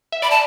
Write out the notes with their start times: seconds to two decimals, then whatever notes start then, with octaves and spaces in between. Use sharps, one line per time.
0.12 E5
0.22 D5 B5
0.31 A5